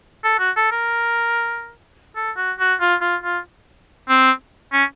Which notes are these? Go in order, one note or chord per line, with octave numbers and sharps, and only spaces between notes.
A4
F#4
A4
A#4
A4
F#4
F#4
F4
F4
F4
C4
C#4